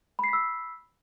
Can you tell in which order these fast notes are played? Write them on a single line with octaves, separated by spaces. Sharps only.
B5 C7 B6 E6